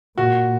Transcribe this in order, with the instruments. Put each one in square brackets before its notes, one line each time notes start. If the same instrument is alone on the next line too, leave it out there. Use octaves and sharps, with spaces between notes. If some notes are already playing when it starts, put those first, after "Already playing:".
[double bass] A#2 [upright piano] F#4